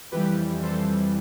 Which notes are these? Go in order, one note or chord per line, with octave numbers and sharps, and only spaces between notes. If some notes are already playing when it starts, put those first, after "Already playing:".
F2 E3 G3 G4 B4
A4 C5